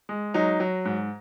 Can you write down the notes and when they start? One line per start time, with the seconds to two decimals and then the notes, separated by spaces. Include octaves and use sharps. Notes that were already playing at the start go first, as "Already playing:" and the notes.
0.09 G#3
0.34 F#3 D#4
0.60 F#3
0.85 G#2